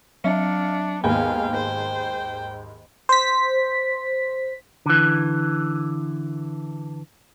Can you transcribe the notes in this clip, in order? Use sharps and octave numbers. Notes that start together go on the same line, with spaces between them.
F#3 D4 E5 F5 C#7
D#2 G#2 B3 F5 G5 G#5 B5
C5
C5 B6
D3 E3